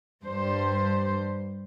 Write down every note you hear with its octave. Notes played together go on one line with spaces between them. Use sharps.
G2 G3 C5